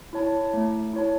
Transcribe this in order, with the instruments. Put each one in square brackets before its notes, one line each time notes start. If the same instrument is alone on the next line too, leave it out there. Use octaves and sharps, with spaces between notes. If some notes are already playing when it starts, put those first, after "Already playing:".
[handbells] E4 C#5 A5
A3
E4 C#5 A5